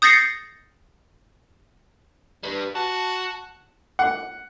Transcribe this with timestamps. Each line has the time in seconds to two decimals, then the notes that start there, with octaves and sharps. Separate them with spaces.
0.02 D#6 G6 A6 A#6 C7 C#7
2.43 G3 B4
2.75 F#4 A5
3.99 F#5